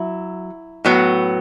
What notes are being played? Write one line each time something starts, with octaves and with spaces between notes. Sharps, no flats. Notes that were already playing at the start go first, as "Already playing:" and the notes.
Already playing: F#3 E4
A2 F#3 B3